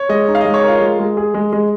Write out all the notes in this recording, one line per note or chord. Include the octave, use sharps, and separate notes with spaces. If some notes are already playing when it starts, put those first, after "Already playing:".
Already playing: C#5
G#3 D#5
D#4
F5
D#5
G#3
C#5
F4 A#4
G#3
G#3
G#4
G#3
G#3